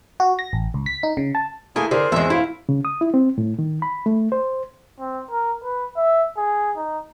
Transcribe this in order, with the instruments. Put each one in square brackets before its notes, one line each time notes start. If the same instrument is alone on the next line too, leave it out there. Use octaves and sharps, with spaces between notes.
[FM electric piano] F#4
A#6
A1
C#2
B6
D#4
C#3
A5
[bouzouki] A3 A#4 G#5 [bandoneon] A#3 G#4 [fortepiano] E4
[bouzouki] D3 [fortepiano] G#4 A#4 [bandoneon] C5
[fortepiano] G#1 E2 [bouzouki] G#3 E5
[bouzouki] A2 [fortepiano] E4 F5
[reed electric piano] C#3
D#6
E4
C4
A2
D#3
B5
A3
C5
[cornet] C4
A#4
B4
E5
G#4
D#4